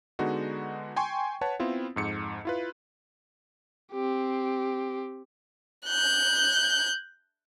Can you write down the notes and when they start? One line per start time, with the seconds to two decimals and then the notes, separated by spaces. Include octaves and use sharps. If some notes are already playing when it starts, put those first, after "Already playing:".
0.19 D3 G#3 B3 D#4 F#4
0.96 G5 G#5 C6 C#6
1.41 B4 C#5 F#5 A5
1.60 B3 C4 E4 F4
1.96 F2 G#2 C#7
2.45 E4 F4 B4
3.92 C4 G4
5.87 F#6 G6